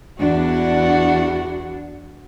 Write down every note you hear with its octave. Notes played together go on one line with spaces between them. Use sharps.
E2 D4 F#4